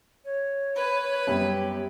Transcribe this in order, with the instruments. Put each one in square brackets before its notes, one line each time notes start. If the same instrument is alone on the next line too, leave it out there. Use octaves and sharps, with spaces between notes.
[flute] C#5
[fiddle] B4
[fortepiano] F#2 G3 B3 [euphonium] G4